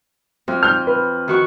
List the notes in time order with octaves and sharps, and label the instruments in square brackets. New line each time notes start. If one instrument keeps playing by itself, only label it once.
[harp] F2
[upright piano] F6 G6
B4
[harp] D#3 F#4 C#6